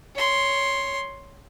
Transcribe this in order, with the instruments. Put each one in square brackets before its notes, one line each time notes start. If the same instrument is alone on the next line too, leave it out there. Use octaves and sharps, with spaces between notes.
[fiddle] C#5 C6